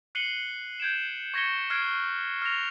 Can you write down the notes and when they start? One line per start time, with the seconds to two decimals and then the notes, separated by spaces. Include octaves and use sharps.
0.15 F#6 C7 C#7 D#7 F#7 G7
0.80 G6 G#6 D7 E7
1.34 C#6 G#6 A#6 B6 C#7 G7
1.70 F6 F#6 G#6 C7 D7
2.42 F6 F#6 A#6 F7